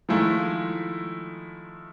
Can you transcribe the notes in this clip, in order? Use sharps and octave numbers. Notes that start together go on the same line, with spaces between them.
D#3 F3 G#3 A3 E4